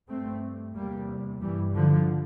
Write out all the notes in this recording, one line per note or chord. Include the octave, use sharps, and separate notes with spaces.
G2 A3 C4
E2 C3 G3 A#3
G2 E3 G3
D3 F3